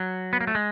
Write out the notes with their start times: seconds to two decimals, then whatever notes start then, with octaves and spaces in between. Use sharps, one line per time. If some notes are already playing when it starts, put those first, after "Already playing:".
Already playing: F#3
0.33 B3
0.41 A#3
0.47 A3
0.55 G#3